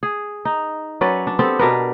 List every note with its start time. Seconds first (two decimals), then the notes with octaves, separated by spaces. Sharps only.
0.03 G#4
0.45 D#4
1.01 F#3 C#4 B4 D5
1.27 D4
1.39 B3 C4 G4 A4
1.59 B2 D4 A#4 B4